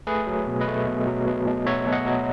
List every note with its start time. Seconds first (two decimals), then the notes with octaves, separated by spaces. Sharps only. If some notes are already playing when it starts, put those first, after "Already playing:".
0.07 A3 G#4 B4
0.27 F#3
0.47 B2
0.61 B4 D#5
0.68 A3
0.86 B2
1.07 F#3
1.27 B2
1.47 B2
1.67 F#3 C#5 E5
1.87 B2
1.92 D#5 F#5
2.06 F#3